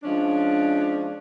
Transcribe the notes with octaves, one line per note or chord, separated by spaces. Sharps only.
F3 G#3 C#4 D4